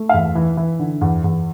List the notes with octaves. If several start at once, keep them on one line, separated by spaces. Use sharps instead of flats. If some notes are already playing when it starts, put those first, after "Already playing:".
Already playing: A3
F5
E2 E5
E3
E3
D3
E2
E2